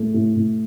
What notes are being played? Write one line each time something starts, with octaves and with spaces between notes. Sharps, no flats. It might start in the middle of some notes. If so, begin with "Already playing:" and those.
Already playing: A2 A3
A2
A2